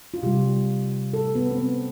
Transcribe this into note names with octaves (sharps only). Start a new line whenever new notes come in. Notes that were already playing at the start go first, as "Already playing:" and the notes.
F4
C3 G3 G4
A4
B3
C4
B3